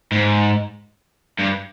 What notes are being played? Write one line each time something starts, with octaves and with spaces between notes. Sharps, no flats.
G#2
G2